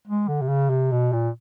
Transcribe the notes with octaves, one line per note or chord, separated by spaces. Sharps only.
G#3
D3
C3
C#3
C3
B2
A#2